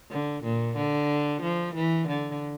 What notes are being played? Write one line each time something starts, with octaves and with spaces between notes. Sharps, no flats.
D3
A#2
D3
F3
E3
D3